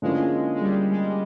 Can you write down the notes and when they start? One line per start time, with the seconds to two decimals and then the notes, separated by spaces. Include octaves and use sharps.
0.02 D3 F3 G#3 A#3 C#4 E4
0.55 G#3
0.61 G3
0.92 G#3